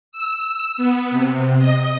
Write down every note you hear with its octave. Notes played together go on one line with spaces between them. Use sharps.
E6
B3
C3
D#5